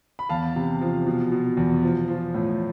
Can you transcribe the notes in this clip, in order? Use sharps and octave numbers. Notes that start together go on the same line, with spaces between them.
B5
E2 F5 A5
C3
F3
B2
B2
E2
F3
F3
A2